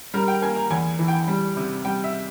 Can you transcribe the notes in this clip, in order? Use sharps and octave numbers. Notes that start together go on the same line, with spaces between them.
G3 A#4
G5
A#3 G#5
A#5
E2 G#5
E3
G5
G3
C3
G3 G5
E5